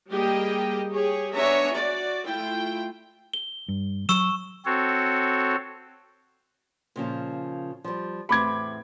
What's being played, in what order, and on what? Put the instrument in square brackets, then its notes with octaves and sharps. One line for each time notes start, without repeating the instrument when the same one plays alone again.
[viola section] G3 A#3 G4 G#4 D#5 G5
G4 G#4 C#5
B3 D4 C#5 E5 G#5 A#5
F#4 D5
A3 E4 F4 G5
[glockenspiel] G7
[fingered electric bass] G2
[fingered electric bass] F#3 [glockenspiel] C#6 E6 E7
[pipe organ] C4 F#4 A4 C#5
[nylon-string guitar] A#2 C#3 F3
F3 G3
[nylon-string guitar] E2 A2 C4 [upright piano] B5 D6 G#6